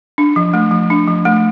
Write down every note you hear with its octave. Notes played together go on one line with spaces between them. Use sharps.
D4
F3
A3
F3
D4
F3
A3